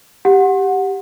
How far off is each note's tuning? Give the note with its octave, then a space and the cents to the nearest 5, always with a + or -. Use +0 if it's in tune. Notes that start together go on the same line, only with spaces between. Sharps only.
G4 +0 F#5 -10